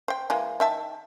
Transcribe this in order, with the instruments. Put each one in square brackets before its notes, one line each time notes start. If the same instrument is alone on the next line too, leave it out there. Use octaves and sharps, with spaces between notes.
[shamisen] C5 G5
E3 G#3 A#3
D#3 E5 A5